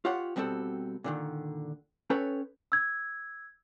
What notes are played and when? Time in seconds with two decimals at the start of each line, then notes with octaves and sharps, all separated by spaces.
0.05 F4 G4 C#5 F#5
0.36 B2 G3 C4 F#4 A4
1.04 A#2 D3 D#3
2.10 C#4 A4 B4 C#5 G5
2.72 E6 G#6